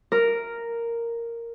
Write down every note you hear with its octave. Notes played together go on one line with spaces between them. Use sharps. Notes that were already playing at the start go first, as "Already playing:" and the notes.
A#4